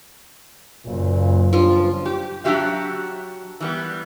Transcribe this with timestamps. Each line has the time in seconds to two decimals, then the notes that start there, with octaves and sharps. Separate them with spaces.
0.85 F#1 A#2
1.53 G2 C#3 F3 D4 F4
2.05 G4
2.44 F#3 D4 F#4 G4 E5 F5
3.60 E3 G3 B3